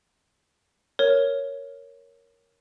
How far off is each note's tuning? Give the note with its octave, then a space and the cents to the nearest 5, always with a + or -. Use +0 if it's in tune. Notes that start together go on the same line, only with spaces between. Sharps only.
A#4 +0 C#5 +0